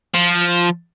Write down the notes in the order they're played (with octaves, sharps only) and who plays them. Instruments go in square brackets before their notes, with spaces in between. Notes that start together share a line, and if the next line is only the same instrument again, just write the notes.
[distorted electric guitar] F3